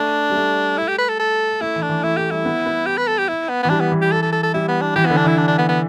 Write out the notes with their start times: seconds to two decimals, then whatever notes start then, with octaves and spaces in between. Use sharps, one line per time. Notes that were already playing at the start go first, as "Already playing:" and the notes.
Already playing: A3 D4
0.30 G3
0.36 A3
0.78 E4
0.88 G4
0.98 B4
1.09 A4
1.20 A4
1.61 A3 E4
1.76 E3
1.82 D4
1.89 E3
2.03 A3 E4
2.17 A3 G4
2.31 G3 E4
2.45 B3
2.66 B3
2.86 G4
2.98 B4
3.08 A4
3.18 G4
3.29 E4
3.49 B3
3.63 E3 B3
3.70 G3 D4
3.81 B3
3.92 E3
4.02 G4
4.12 A4
4.23 A4
4.33 A4
4.43 A4
4.54 G3 E4
4.68 B3
4.82 D4
4.96 E3 G4
5.06 D3 B3
5.17 D4
5.24 E3 E4
5.38 D4
5.48 D4
5.58 B3
5.69 B3